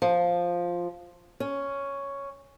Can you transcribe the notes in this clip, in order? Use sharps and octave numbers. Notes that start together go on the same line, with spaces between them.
F3
C#4